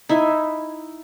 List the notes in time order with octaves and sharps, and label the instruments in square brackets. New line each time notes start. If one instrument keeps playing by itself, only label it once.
[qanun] D#4 E4 E5 G#5